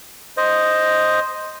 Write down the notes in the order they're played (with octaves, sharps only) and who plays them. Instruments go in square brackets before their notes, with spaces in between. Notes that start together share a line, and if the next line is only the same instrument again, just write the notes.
[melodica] C5 D#5